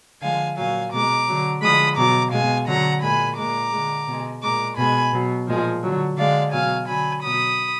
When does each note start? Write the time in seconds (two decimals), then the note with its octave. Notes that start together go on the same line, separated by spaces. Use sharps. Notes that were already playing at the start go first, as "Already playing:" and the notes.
0.21 D3 F3 G#3 F5 G#5
0.57 A#2 F#3 F5 G#5
0.92 B2 G#3 A#5 D6
1.28 D3 F#3
1.62 D3 F3 G#3 B5 D#6
1.97 B2 F#3 A#5 D6
2.32 B2 G#3 F5 G#5
2.67 D3 F#3 F#5 A#5
3.02 A#2 G#3 G#5 B5
3.37 A#2 G#3 A#5 D6
3.72 D3 G#3
4.07 B2 G#3
4.42 A#2 G#3 A#5 D6
4.77 B2 G#3 G#5 B5
5.12 B2 F#3
5.47 A#2 F3 G#3
5.82 D3 F#3
6.18 D3 G#3 D5 F5
6.52 B2 F#3 F5 G#5
6.87 D3 F#3 G#5 B5
7.22 B2 F#3 B5 D#6